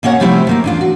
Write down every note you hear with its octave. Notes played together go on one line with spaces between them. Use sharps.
B2 A#3 C#4 C#5 F#5
C3 F3 G3 A3 C4 E4
D#3 A#3 C4
E2 D4 F4
F#4